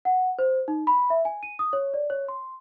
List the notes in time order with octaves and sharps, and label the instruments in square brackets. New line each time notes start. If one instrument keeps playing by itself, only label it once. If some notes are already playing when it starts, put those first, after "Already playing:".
[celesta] F#5
C5
D#4
B5
E5
G#5
D#7
D#6
C#5
D5
C#5
C6